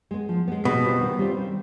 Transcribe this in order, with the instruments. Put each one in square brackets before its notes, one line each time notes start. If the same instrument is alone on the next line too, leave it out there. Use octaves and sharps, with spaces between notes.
[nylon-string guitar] G#3 B3
F3
G#3 B3
[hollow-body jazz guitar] B2 [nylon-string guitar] D#3
[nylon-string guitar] G3 C4 F4
D#3
G3 C4 F4
D#3